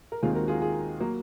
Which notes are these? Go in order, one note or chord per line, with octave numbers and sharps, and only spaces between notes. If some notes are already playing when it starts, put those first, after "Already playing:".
A#4
D#2 D#3 G#3 C4 F4 G#4
F#4 A#4
F4 G#4
F4 G#4
F#3 A#3